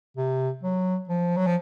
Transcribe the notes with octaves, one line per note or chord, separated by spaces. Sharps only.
C3
F#3
F3
F#3
F3